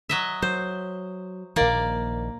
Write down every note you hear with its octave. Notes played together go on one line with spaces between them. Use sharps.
F#3 D#5 E5
F#3 C5
A#1 D#3 A#3 D5